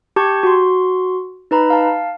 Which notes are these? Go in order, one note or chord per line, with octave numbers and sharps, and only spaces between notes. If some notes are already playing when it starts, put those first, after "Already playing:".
G4 A5 C#6 G6 G#6
F#4 C6
D#4 B4 A#5 B5
F5 A5